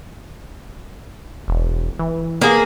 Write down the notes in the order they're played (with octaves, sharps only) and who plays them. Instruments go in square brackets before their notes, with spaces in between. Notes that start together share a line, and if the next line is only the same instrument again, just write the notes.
[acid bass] E1
E3
[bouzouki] A#3 G#4 [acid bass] B3